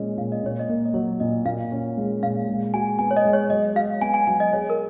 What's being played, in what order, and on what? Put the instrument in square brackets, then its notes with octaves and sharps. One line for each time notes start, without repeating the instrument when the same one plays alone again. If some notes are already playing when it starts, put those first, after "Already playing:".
Already playing: [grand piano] A#2 G#3 C#4 [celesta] D#5
[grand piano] A#2 [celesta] F5
[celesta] D#5
[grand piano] A#2 [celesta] C#5
[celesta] D#5
[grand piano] A#3
[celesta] D#5
[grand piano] F#3 [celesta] C#5
[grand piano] A#2 [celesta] D#5
[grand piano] A#2 [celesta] F5
[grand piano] C#4
G#3
[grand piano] A#2 [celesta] F5
[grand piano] G#3
[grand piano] F#4 [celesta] G#5
[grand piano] B3 [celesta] G#5
[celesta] C#5
D#5
[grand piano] G#3
[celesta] C#5
[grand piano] F#3 [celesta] D#5
[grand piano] F#4 [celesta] F5
[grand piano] B3 [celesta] G#5
[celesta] G#5
[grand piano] F#3 [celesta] G#5
[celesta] D#5
[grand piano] G#4 [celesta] C#5
[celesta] A#4